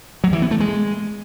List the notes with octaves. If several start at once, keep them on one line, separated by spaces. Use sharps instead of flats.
F#3
E3
B3
A3
G#3